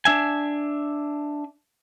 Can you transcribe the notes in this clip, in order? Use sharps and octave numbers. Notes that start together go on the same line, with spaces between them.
D4 E5 G#5